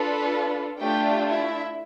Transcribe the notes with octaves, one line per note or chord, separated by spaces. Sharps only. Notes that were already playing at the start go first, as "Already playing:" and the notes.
Already playing: D4 F4 A4 B4 B5
A3 D4 F4 G4 G5
E4 E5